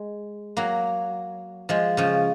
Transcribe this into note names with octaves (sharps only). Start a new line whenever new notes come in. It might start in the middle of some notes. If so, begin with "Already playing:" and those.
Already playing: G#3
F#3 A#3
F3 G#3
C#3 F3